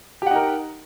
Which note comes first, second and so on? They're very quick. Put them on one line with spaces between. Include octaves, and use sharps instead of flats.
G4 F#5 D#4 A#4